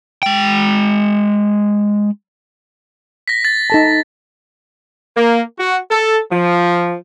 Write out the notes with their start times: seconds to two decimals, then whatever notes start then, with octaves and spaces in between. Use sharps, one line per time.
0.23 G#3 G5
3.28 A#6 B6
3.45 A6
3.70 D#4 A4 A5
5.16 A#3
5.59 F#4
5.91 A4
6.32 F3